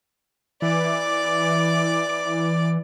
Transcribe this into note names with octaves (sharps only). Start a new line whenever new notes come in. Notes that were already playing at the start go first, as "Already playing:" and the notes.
E3 D5 D6